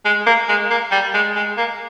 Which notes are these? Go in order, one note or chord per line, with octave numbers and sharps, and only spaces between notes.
G#3
A#3
G#3
A#3
G3
G#3
G#3
A#3